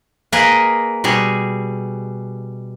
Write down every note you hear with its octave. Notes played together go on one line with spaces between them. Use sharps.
A#3 G#4 A#4 B4 D#5
B2 G3 G#4